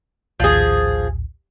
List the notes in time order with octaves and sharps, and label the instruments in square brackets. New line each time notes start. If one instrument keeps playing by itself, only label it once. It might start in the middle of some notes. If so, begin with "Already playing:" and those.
[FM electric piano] A#1 D#2 A2 [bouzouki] F3 G#4